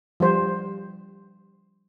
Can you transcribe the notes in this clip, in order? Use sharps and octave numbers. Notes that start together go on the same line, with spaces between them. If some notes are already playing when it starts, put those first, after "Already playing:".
F3 G3 C5